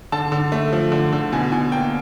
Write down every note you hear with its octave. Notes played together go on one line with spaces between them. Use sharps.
D3 A5
D3
A3
F3
D3
D3
B2 G#5
B2 G#5
A#3 G5